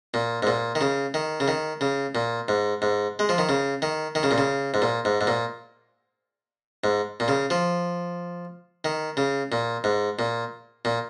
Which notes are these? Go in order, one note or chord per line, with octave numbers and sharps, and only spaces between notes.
A#2
G#2
A#2
D#3
C#3
D#3
C#3
D#3
C#3
A#2
G#2
G#2
G#3
F3
D#3
C#3
D#3
D#3
C#3
A#2
C#3
G#2
A#2
G#2
G#2
A#2
G#2
A#2
C#3
F3
D#3
C#3
A#2
G#2
A#2
A#2